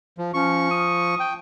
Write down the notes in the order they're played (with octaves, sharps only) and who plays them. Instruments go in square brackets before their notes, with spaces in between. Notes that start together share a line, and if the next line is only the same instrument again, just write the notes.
[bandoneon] F3
[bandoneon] F3 C#6 [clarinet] C#4
[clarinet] D#6
[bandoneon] G5